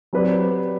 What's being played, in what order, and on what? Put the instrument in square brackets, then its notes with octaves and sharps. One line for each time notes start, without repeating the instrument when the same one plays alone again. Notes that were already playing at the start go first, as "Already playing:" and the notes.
[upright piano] F#3 C4 G4 B4 D5